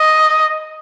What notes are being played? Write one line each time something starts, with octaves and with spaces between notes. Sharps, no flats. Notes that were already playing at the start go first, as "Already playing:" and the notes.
Already playing: D#5